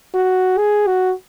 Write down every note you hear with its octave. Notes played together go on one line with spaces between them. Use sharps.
F#4
G#4
F#4